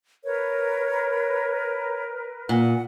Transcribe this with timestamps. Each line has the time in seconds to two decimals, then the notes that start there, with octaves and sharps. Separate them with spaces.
0.24 A#4 B4 C#5
2.49 A#2 F#5